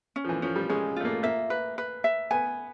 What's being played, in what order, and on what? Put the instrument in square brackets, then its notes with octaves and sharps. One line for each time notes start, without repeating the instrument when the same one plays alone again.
[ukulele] C#4
[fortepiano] F3
E3
[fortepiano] F3 [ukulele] C#4
[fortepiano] G3
[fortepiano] G#3 [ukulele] C#4
[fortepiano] A3 [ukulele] F4
[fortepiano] A#3
[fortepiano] A#3 [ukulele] E5
[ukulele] B4
B4
E5
[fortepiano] B3 [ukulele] G#5